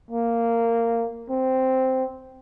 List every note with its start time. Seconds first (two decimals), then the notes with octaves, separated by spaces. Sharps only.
0.11 A#3
1.30 C4